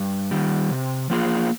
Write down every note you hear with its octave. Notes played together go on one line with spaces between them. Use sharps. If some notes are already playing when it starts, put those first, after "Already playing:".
Already playing: G2
D#3 G3
C3
F3 A#3 F4 G#4